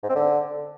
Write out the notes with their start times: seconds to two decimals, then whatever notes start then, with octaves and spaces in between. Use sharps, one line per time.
0.03 G#2
0.09 C4
0.16 D3